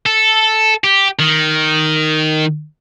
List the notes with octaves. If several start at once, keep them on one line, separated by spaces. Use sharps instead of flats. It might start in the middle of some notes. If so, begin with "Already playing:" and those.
A4
G4
D#3